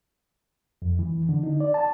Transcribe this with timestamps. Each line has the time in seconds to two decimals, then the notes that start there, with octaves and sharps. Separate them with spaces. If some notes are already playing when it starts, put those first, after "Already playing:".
0.82 F2
0.99 E3
1.29 D3
1.43 D#4
1.60 D5
1.74 A5